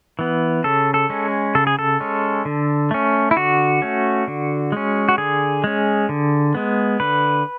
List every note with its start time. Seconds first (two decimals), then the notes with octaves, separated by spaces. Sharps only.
0.19 E3 B3
0.64 C#3 A4
0.94 A4
1.10 G#3 C#4
1.55 C#3 A4
1.67 G#4
1.79 A4
2.00 G#3 C#4
2.45 D3
2.91 A3 C#4
3.31 E4
3.36 D3 F#4
3.82 A3 C#4
4.28 D3
4.72 G#3 C#4
5.09 F#4
5.18 D3 G#4
5.64 G#3 C#4
6.09 D3
6.55 G#3 B3
7.00 D3 B4